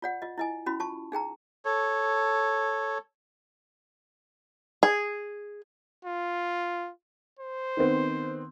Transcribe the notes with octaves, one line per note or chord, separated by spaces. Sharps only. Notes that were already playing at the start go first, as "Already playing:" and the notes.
F4 D5 F#5
F4 D#5
E4 D#5 G#5
C#4 E4 F#4 B5
F4 A5 C#6
D#4 G#4 G5 A#5
A4 C#5
G#4
F4
C5
D#3 B3 C4